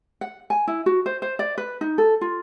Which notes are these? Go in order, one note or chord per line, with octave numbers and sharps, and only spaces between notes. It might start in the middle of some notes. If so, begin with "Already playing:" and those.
F#5
G#5
E4
F#4
C5
C5
D5
B4
D#4
A4
F4